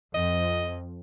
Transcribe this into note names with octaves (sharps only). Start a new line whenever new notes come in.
F2 D#5